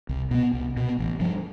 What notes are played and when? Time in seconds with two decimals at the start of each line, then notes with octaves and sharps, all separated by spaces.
0.09 C2
0.31 B2 B3
0.53 C2
0.77 B2 B3
0.99 A1
1.20 G2 F3